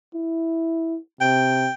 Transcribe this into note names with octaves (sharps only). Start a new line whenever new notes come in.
E4
C3 G5